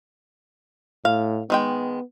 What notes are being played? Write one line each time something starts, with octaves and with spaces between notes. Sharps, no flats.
A2 F5
D#3 G#3 B3 G5